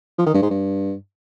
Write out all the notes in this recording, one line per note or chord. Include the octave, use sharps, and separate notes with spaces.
F3
D#3
G2
G#2
G2